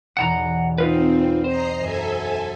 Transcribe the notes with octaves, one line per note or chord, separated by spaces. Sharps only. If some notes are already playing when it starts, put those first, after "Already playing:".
B1 E2 F#5 A5 A#5
C4 D#4 F4 B4
C5 D#5 A#5 C7
F#2 A4 E5 G#5